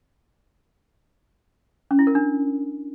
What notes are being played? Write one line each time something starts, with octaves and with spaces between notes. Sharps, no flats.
C#4
E4
A#4
D4